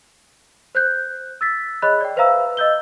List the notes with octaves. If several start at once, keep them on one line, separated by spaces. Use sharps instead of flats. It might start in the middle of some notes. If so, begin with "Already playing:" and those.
C5 F#6 G6
E6 A6 B6
G#4 C#5 D#5 B5 F#6
D5 G5
B4 C5 E5 F5 A#5 E6
D#5 E6 G6 G7